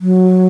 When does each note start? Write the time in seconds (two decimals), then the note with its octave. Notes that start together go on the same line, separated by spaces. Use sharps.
0.01 F#3